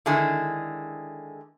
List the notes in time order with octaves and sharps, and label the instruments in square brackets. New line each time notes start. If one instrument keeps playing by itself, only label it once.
[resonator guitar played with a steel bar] D3 D#3 G#3 E4 G#4